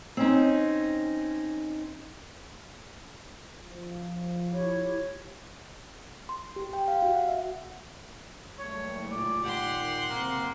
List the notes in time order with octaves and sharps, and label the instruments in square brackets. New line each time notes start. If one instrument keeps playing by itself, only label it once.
[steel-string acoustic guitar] C4 C#4 D#4
[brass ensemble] F3
[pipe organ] E4 F4 G4 [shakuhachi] C#5
[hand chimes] C6
G4
G5
F5
F#4
F#5
E5
[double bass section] F#1 G3 A3 [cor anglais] C#5
[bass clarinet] A#2 [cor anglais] D5
[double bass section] D#3 [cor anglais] G4 [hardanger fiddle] F#5 C6
[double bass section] F#1 C3 C4 [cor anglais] A#3